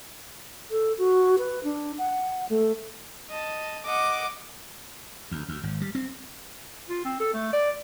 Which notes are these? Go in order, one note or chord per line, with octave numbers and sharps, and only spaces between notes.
A4
F#4
B4
D4
F#5
A3
D#5 A5
D#5 F#5 D6
D2
D2
G#1
G3
C4
F4
C4
A4
A3
D5